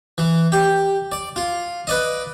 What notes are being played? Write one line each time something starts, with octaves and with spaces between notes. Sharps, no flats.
E3
G4
D5
F4
B4 D5 D#5